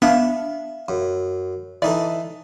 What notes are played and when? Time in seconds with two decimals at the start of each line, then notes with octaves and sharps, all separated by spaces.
0.02 B3 D4 E5 F5 B5
0.89 F#2
1.82 E3 D#4 A4 D5